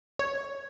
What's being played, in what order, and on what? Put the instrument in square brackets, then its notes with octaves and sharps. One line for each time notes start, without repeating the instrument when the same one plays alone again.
[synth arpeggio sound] C#5